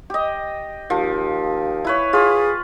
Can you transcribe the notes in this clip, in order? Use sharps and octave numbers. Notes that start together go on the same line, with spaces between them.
G4 D#5
D#2 F3
E4 B4 C#5
F4 G#4 B4